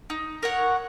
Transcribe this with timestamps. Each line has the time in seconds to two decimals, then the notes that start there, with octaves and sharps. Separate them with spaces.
0.10 D#4
0.43 A#4 C#5 F#5